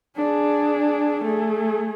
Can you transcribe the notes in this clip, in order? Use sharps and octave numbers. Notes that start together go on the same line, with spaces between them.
D4 G#4
A3 G#4